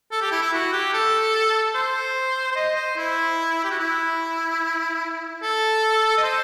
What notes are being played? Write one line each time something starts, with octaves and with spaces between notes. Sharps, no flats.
A4
G4
E4
E4
F#4
G4
A4
C5
C5
D#5
C5
E4
G4
F#4
E4
A4
D#5
C5